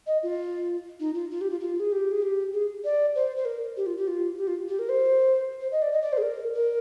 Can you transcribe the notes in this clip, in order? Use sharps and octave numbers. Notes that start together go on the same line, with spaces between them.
D#5
F4
D#4
F4
F4
G4
F4
F4
G#4
G4
G#4
G4
G#4
D5
C5
C5
A#4
G4
F4
G4
F4
G4
F4
G4
A#4
C5
C5
D#5
D5
D#5
D5
C5
G#4
A#4
A#4